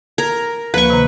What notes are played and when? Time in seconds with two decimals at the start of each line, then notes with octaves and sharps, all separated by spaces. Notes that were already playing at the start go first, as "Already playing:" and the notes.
0.18 A#4 G#6
0.74 D2 F3 A#3 B4 C#6
0.90 C3 D#3 A#3